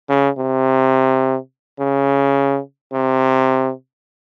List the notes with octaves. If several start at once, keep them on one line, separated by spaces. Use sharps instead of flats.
C#3
C3
C#3
C3